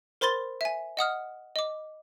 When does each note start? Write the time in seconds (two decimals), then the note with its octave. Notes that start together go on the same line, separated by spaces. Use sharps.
0.21 A#4 C5 B5 C6 A6 G7
0.61 E5 G#5
0.97 D#5 F#5 D#6 F6
1.56 D#5 D6